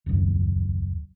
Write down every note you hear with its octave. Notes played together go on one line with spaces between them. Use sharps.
D#1 G#1 C#2 F#2